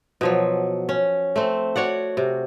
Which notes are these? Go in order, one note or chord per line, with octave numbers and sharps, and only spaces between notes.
B2 F3 F#3
C#4
A3 C4
F#4 C#5 D5 F#5
C3